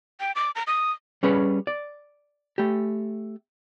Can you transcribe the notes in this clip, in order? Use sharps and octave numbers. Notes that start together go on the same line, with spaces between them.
G5
D6
A#5
D#6
G3 C#4 G#4 B4 C#5
D5
A3 G4